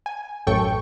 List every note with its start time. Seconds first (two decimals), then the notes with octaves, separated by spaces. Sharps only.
0.06 G#5
0.47 A1 F#2 A4 G5 C#6